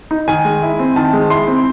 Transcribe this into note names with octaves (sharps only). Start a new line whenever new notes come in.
D#4
D#3 G#5
G#3
E4
C4
D#3 A5
G#3
E4 C6
C4